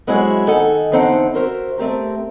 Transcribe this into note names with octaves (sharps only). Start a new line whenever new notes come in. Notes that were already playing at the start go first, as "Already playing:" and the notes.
F#3 G#3 C4 E4 F#4 G#4
D#3 D#4 A4 F#5 G#5
E2 D3 C4 D#4 F#5 A5
F#4 A#4 C5 E5
A3 C4 G4 A#4